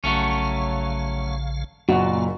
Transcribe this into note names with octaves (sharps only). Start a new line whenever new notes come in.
A#1 C#3 F#3 A3 C#4 F5
F#1 A#2 F#4 F5 F#5